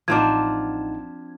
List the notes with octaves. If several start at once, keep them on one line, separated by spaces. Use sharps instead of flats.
A1 F3 C4 D4 D#4 F#5 G#6